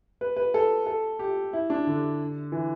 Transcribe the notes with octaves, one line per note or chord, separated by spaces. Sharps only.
B4
B4
A4
A4
G4
E4
D4
D3
E3